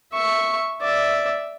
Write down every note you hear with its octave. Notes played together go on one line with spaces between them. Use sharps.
E5 C#6
D5 E5